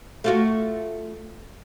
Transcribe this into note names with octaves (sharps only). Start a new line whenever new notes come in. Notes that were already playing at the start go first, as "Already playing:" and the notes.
A3 F4 F#4